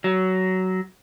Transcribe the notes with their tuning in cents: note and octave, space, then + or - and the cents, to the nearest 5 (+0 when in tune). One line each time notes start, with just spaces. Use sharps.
F#3 +15